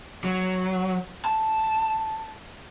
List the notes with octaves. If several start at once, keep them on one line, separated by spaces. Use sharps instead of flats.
F#3
A5